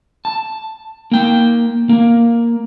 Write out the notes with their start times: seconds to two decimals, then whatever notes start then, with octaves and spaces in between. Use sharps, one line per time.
0.25 A5
1.11 A#3 G5
1.89 A#3